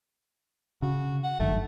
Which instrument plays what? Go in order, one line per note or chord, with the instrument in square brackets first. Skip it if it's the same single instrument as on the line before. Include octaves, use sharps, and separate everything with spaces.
[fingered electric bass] C#3 [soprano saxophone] F#4
[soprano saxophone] F#5
[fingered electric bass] G1 F#2 D#3 [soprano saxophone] A3